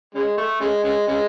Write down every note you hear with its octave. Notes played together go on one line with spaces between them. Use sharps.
C#3 G#3
A3
C#3 G#3
C#3 G#3
C#3 G#3